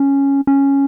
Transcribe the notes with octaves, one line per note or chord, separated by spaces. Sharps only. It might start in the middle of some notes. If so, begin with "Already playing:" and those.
Already playing: C#4
C#4